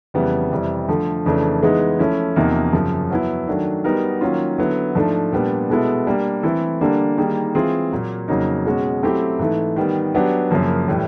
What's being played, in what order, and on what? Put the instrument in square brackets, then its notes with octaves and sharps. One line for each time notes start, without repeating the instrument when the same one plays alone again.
[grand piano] F2 C#3 E3 G3 B3
F2 C3 E3 G3
D3 F3 A3
F2 C#3 E3 A3 D4
E3 G#3 B3 D#4 G#4
F3 A3 C#4 E4
E2 C3 F3 A#3 D#4
F#2 C#3 F3
F#3 B3 E4
D#3 F#3 A3 D4
G3 B3 D#4 F#4 A#4
D#3 F#3 A#3 C#4 F4
D3 F#3 B3 E4
G#2 F3 A3 D4
A#2 G3 B3 D4
B2 G#3 B3 E4 A4
G3 A#3 D4
E3 A3 C4 E4 A4
D3 G3 A#3 D4
D#3 G3 A#3 D#4 G#4
E3 G#3 C4 F4 G#4
A#2 F#3 A#3
F2 C#3 F#3 A#3 D#4
B2 G#3 C#4 F#4
F#3 A3 C4 E4 G4
G#2 E3 A3
D#3 G3 B3
F#3 B3 D4 G4
F#2 C#3 F3 A#3
A2 E3 G3